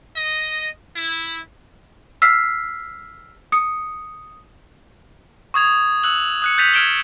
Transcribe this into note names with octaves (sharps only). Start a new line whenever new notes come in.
D#5
E4
E6 F6 B6 C7
D#6 C#7
C#6 D#6 G#6 F7
E6 F#6 F#7
D#6 F#6 C#7
F#6 G6 A6 B6 D#7 F7
F6 G#6 D7 E7 G7